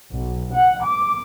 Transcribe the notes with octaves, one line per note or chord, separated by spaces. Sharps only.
B1
F#5
D6